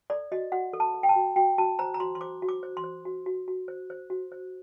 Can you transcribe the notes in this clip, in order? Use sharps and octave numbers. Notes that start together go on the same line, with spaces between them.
A4 D5
F#4 D#5
F#4 F#5
A4
A5
A4
G5
A5
F#4
F#4 G5
F#4 A5
C5 A#5
A#5
F#4 C6
C6
C5 D6
F#4
D6
C5
C6
C5
F#4
F#4
F#4
C5
C5
F#4
C5